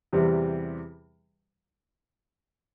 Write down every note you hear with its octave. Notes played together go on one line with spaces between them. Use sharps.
E2 C3 E3 G3